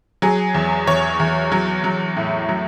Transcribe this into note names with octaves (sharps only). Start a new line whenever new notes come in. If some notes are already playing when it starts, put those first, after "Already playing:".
F#3 G#4
E2
E2 C#5
E2
F#3
F#3
A2
F#3